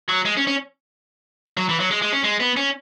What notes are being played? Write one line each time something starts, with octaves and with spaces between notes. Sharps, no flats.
F#3
G#3
C#4
C#4
F#3
E3
F#3
G#3
G#3
C#4
G#3
B3
C#4